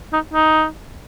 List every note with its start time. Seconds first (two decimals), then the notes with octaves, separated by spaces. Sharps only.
0.13 D#4
0.34 D#4